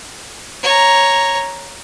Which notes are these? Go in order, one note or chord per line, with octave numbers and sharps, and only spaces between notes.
C#5 A#5